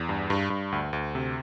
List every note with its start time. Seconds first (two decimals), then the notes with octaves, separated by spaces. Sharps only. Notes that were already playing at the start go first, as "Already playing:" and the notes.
Already playing: E2
0.09 G2
0.30 G2
0.50 G2
0.72 D2
0.93 D2
1.15 C3